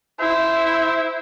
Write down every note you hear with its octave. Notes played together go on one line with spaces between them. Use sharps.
E4 C5